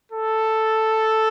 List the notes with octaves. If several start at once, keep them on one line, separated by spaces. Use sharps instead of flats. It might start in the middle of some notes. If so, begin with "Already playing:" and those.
A4